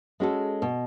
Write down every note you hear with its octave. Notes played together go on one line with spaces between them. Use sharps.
G#3 C#4 F#4 A4
B2